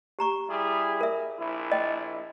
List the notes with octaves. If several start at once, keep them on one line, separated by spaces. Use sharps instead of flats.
G4 A#5 C#6
G3 E4 G#4
A#4 E5
A#1 E4
D#5 G5